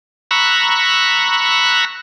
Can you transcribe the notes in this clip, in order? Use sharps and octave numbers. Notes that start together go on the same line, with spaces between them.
A#5 B5 C#6 E6 F#6